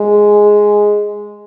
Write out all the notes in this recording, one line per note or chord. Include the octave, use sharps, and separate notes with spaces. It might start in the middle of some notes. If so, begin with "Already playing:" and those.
Already playing: G#3